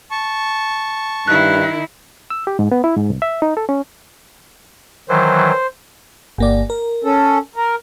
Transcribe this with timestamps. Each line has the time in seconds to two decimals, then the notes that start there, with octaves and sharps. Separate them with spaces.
0.11 A5 C#6
1.28 G2 D#3 E4 F#6
2.30 E6
2.47 G4
2.59 G#2
2.72 B3
2.84 E4
2.97 G#2
3.10 C2
3.22 E5
3.42 D#4
3.57 A4
3.69 C#4
5.09 D#3 E3 F#3 C5
6.38 G1 A#3 D5
6.70 A#4
7.04 C#4 A4
7.56 A#4